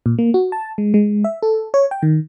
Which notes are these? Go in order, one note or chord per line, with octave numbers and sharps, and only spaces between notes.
A#2
A#3
F#4
A5
G#3
G#3
E5
A4
C#5
G5
D#3